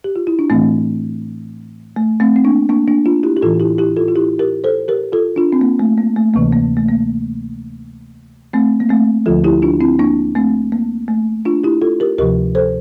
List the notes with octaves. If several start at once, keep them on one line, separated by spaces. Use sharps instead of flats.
G4
F4
E4
D4
A2 E3 A3 C4
A3
A3 C4
C4
A#3 D4
A#3 D4
A#3 D4
D4 F4
E4 G4
G4
A2 E3 F4 A4
E4 G4
E4 G4
F4 A4
F4
E4 G4
G4 A#4
A4 C5
G4 A#4
F4 A4
D4 F4
C4
A#3
A3
A#3
A3
D2 C3 E3 A#3
A#3
A3
A#3
A3 C4
A#3
A3 C4
D2 D3 F3 F4 A4
E4 G4
D4 F4
C4 E4
A#3 D4
A3 C4
A#3
A3
D4 F4
E4 G4
F4 A4
G4 A#4
D2 C3 F3 G4 A#4
A4 C5